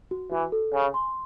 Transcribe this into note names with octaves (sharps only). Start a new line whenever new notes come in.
F#4
E3 F#4
A4
C#3 G#5
C6